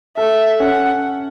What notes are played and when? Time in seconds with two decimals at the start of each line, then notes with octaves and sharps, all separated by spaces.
0.17 A4 E5
0.59 C#4 F#5